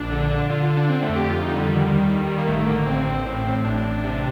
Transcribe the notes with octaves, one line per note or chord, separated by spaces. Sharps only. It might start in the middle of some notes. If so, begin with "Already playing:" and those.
Already playing: A#1 D4
D3
D3
D3 F4
F4
D3
D4
D3 C4
A3
F2
G4
F2 F4
D#4
D3
G3
D#3
D#2
D#3
D#3
A#3
A1 A3
D3 A#3
A1 C4
A1
A2
A2
A1 D4
A1
C3